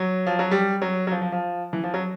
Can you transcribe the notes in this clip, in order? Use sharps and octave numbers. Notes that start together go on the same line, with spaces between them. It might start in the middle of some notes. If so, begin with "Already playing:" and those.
Already playing: F#3
F3
F#3
G3
F#3
F#3
F3
F3
F3
E3
F3
F#3